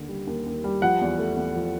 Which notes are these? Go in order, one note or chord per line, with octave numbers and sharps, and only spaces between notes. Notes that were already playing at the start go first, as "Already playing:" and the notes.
Already playing: D#2 D3
G3
D#2
D#2
G3
F3 F#5
E2
A3
E2
F3